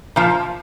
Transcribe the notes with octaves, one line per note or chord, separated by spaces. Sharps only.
A#2 F3